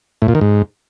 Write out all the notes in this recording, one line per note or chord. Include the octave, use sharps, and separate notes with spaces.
A2
A#2
D#3
G#2